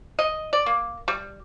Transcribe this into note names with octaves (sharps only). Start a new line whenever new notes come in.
D#5
D5
A#3
G3